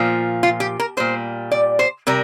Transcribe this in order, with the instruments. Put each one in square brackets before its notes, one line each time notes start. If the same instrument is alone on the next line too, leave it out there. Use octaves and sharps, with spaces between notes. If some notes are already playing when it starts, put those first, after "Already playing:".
Already playing: [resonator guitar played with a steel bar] A#2 F3
F4
G4
A#4
A#2 G3 C5
D5
C5
C3 G3 A#4